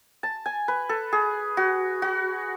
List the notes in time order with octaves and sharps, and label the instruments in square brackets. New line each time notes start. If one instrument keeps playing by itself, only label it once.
[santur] A5
G#5
B4
A4
G#4
F#4
F#4